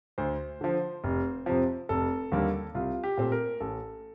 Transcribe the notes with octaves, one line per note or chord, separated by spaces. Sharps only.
D2 C5
D3 F3
F1
F2 C3 F3
F1 A4
D#2 D3 G3 A#3
C2 F4
G4
A#2 A3 C4 C5
A#4
A1 A4